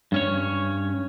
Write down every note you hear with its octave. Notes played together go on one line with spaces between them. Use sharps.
G2 C#4 C#5